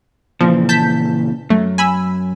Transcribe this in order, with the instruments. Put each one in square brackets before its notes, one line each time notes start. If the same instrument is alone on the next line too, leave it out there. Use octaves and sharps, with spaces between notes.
[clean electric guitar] A#2 C#3 E3 [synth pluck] F3
[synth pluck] A5 G6 B6
[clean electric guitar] F#2 [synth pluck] A3
[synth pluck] G#5 B5 E6